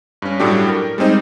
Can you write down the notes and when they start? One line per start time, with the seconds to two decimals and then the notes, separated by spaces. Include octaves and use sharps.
0.22 G2 C#4
0.40 A2 F#3 G3 A3 D4 G4
0.69 A#4
0.98 G3 G#3 C4 D#4 C5